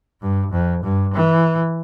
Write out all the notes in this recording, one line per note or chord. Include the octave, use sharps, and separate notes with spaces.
G2
F2
G2
E3